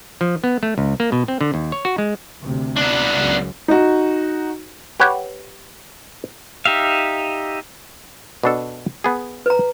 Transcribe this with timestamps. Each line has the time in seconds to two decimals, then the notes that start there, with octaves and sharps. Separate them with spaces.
0.21 F3
0.44 B3
0.63 A3
0.78 C#2
1.00 A#3
1.12 B2
1.28 C4
1.41 D3
1.54 D#2
1.72 C#5
1.85 F#4
1.98 G#3
2.43 D2 C3
2.77 B3 D4
3.15 C#2 F#2
3.68 D#4 F#4
5.00 G4 B4 C#5 F#5
6.65 D#4 G4 E5 F5
8.44 B2 D4 A4
9.04 B3 G#4
9.46 B4 A#5